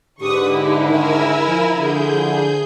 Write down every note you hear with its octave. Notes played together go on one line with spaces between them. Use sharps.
G#2 D3 G4 B4 C#6 D#6
D#4 E4
D#3 A#4 G#5 E6
F3
D3 G#4 G6
F3